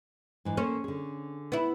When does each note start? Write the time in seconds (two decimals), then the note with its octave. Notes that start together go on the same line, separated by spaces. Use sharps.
0.45 G#2 E3 D4
0.57 A#3 C#4 A4 C5
0.84 D3 G#4
1.52 B3 E4